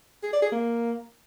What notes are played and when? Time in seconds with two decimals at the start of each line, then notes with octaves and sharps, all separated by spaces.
0.23 G#4
0.33 D5
0.42 G#4
0.52 A#3